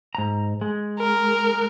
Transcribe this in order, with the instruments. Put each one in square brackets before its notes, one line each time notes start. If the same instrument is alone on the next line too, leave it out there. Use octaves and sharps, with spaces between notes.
[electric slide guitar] G#2 A#5
G#3
[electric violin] A#4